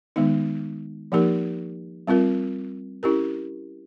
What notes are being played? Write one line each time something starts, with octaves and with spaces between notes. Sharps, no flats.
D#3 G#3 B3 D#4
F3 A#3 D#4 G4 A#4
G3 C4 F4 A#4
C#4 E4 G4 A#4